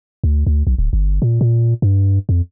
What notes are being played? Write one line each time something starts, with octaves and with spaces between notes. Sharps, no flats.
D2
D2
B1
D1
G1
A#2
A#2
G2
F2